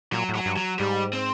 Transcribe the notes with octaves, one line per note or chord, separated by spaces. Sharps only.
A#2 F#3
A2
F#3
G2
F#3
G#2 G3
C4